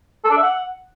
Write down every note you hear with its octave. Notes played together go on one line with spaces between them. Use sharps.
A4
D4
E5
F#5